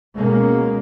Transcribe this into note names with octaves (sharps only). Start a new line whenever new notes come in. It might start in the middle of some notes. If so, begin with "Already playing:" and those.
B2 G#3 A#3 C#4